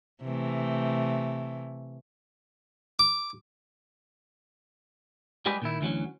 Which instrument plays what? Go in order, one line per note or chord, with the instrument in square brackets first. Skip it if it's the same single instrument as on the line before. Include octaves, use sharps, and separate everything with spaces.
[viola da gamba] C3 E3 A3
[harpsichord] D6
[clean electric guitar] G3 G#3 G4 G#4 B4
A#2 D#3 E4
D2 E3 F#3 C#4